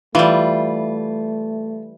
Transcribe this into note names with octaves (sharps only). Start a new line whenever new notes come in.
E3 G3 A3 F4